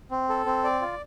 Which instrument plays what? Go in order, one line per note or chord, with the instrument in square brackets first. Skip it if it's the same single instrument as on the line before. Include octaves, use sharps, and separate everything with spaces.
[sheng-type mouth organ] C4
A4
C4
D5
F4